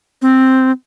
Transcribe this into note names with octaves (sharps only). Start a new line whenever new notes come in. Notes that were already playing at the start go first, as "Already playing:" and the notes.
C4